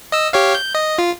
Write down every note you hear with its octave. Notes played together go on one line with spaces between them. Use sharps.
D#5 E6
G4 C#5 F5
G6
D#5
F4